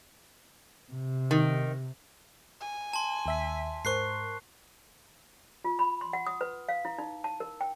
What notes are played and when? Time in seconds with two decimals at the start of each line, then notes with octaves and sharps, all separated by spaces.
0.92 C3
1.31 D#3
2.61 G#5
2.93 A5 C6
3.26 D#2 E5 B6
3.85 G#2 A#4 C5 C#6 F#6 C7
5.64 F4
5.79 B5
6.01 C6
6.13 F#5
6.27 D#6
6.41 B4
6.69 F5
6.85 E4
6.98 D#4
7.24 A5
7.40 A#4
7.61 G5